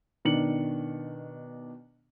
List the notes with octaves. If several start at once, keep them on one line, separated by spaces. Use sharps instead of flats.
B2 D#3 D4 C#7 F#7